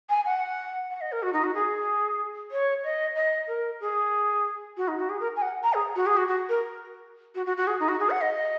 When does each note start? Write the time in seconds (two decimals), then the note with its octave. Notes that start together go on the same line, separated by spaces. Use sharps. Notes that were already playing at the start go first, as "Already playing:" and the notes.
0.09 G#5
0.26 F#5
0.90 F#5
1.01 D#5
1.12 A#4
1.23 F#4
1.33 D#4
1.44 F#4
1.54 G#4
2.51 C#5
2.84 D#5
3.16 D#5
3.48 A#4
3.81 G#4
4.77 F#4
4.88 D#4
4.99 F#4
5.10 G#4
5.20 A#4
5.36 G#5
5.42 F#5
5.63 A#5
5.74 G#4
5.96 F#4
6.06 G#4
6.17 F#4
6.28 F#4
6.49 A#4
7.35 F#4
7.46 F#4
7.57 F#4
7.67 G#4
7.80 D#4
7.89 F#4
8.00 G#4
8.10 F#5
8.21 D#5